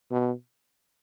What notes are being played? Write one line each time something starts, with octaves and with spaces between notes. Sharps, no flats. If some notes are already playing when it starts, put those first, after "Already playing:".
B2